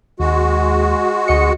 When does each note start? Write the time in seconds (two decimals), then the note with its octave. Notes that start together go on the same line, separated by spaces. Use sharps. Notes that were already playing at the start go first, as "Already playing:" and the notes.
0.20 D#2 G#3 F#4
1.28 D2 D#5 C#7